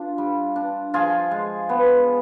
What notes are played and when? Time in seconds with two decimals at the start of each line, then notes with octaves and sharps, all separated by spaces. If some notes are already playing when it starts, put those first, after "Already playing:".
Already playing: D4 F4
0.18 G3
0.56 D4
0.94 F3 F4 G#4
1.31 G#3
1.69 B3